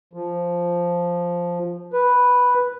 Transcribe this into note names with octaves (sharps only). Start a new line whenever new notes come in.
F3
B4